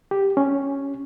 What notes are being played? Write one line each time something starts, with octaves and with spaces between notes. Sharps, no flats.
G4
C#4